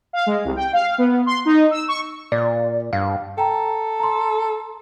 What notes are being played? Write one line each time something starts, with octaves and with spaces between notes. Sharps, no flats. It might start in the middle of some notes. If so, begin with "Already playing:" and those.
F5
G#3
C2
G5
F5
B3
C6
D#4
E6
C#6
A#2 D5
G2 F5
A4 G5 A#5
A#5 C6